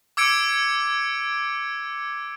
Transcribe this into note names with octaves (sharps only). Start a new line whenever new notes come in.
D6 E6 G#6 C#7 D7